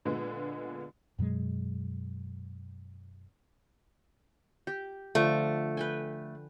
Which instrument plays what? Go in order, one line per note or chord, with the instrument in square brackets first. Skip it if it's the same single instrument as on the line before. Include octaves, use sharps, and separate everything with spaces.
[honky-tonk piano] A#2 D3 G#3 B3
[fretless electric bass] F#2 B2 F#3 G#3
[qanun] G4
[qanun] D3 F3 D4 [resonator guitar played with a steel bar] A3
[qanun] B4 G5 G#5